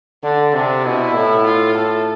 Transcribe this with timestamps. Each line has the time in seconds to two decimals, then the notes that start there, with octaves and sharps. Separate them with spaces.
0.23 D3 D4
0.54 C3 D4
0.85 B2 E4
1.16 A2
1.46 F4
1.77 A2 A4